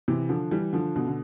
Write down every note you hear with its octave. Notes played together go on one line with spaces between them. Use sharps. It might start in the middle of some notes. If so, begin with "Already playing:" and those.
C3 E3
D3 F3
E3 G3
D3 F3
B2 D3
D3